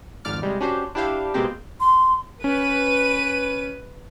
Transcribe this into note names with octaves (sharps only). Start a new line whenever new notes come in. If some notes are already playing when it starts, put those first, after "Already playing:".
G#1 F2 G#2 D5 D6 F6
C2 G3 G#3
C#4 D4 F#4 G4 C5
D4 E4 G4 C5 F5
B2 G#3 A#3 C4 G4
C6
C#4 B4 D#7